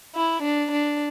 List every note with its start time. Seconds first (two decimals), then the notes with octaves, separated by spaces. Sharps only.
0.15 E4
0.42 D4
0.71 D4